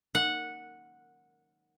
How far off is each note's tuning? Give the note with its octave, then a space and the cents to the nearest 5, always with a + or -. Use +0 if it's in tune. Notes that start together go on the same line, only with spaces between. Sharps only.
F#5 -10